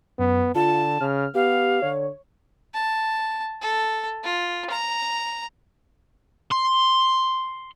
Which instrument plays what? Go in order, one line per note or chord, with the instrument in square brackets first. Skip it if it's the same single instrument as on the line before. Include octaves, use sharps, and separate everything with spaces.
[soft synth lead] F#2 [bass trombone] B3
[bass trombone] D3 [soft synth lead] F4 [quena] A5
[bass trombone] C#3 [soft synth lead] F6
[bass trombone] B3 [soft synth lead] G4 [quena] F5
[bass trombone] D3 [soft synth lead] C#5
[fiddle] A5
A4
F4
A#5
[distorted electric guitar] C6